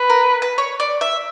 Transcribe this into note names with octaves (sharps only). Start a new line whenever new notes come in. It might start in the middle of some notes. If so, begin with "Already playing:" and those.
Already playing: B4
A#4
B4
C#5
D5
E5